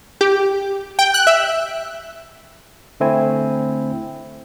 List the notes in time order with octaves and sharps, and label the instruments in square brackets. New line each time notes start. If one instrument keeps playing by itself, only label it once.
[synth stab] G4
G5
F#6
E5
[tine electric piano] D3 A3 C4 E4 G#5